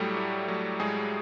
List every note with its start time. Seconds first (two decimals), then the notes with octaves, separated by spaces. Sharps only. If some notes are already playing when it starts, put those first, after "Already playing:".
Already playing: A2 F#3 G3 A3 G4
0.17 A2
0.48 F#3 A3
0.80 A2 G#3 G#4